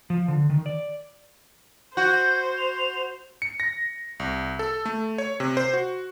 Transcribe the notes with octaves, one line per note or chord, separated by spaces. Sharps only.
F3
D3
D#3
D5
F#4 C5 G6
F7
C#7
A#6
C2
A4
A3
C#5
C3
C5
F#4